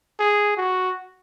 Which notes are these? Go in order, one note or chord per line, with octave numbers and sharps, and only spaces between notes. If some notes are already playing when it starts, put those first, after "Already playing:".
G#4
F#4